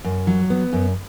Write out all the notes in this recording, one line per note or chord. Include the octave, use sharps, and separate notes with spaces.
F#2
F#3
B3
F#2